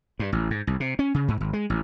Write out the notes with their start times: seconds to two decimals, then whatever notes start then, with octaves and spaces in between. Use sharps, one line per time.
0.19 G2
0.33 A1
0.50 G#2
0.67 C2
0.80 C3
0.99 C#4
1.14 C#3
1.28 G#2
1.41 G#1
1.53 G#3
1.70 A1